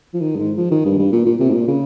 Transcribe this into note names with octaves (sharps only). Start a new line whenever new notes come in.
F3
D#3
G2
G#2
F3
D#3
G2
G2
A#2
A#2
C3
G#2
A#2
C#3